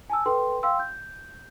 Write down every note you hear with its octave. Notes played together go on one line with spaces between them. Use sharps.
G#5 A5 E6
A4 B4 G5 C6
F5 G5 C6 E6
G6